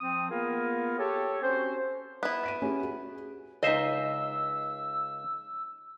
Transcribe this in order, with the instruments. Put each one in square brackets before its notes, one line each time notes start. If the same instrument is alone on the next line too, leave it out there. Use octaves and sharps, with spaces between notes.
[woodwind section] F3 C4 D#6
A#3 B3 F4 G#4 A#4
G4 A4 C#5
C4 C#4 F#4 C5
[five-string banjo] B3 E4
[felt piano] B6 D7 D#7
C#4 G4 G#4
F#4 G#4
[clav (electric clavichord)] C#2 C5 E5 [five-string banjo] D#4 D#5 [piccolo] E6